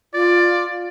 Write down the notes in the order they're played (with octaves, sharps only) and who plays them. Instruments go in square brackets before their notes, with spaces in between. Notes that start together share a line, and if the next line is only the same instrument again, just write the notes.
[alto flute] F4 [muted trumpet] D5